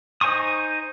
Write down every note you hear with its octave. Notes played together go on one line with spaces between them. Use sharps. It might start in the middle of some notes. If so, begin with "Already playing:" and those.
D#4 C5 G#5 C#6 D#6